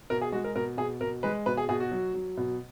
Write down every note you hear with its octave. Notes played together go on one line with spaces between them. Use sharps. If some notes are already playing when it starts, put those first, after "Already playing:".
B2 A#4
G#4
G#3 F#4
A#4
B2 A#4
B2 G#4
B2 A#4
G#3 B4
B2 B4
G#4
B2 G#4
F#4
F#3
F#3
B2